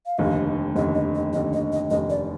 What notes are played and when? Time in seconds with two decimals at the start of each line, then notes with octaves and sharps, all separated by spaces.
0.06 F5
0.18 F1 D#2 D3 D#5
0.76 F1 D#2 D3 D#5
0.95 D#5
1.15 D#5
1.33 F1 D#2 D3 D#5
1.53 D#5
1.72 D#5
1.90 F1 D#2 D3 D#5
2.10 D5